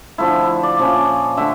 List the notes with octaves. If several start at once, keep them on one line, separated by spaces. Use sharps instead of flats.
D3 F3 A3 E4
D5
A#2 F3 C#4
D3 A3 E5